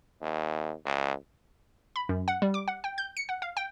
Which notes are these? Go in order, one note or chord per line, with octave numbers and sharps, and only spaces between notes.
D#2
C#2
B5
F#2
F#5
G3
D6
F#5
G5
G6
C#7
F#5
F5
G5